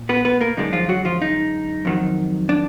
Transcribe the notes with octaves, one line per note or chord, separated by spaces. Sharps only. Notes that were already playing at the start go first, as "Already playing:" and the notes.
Already playing: A#2
B3 B4
B3 B4
A#3 A#4
F#2 D3 G#3 D4 D#4
F3 F4
F#3 F#4
F3 F4
D#4
F2 D#3 F#3
D4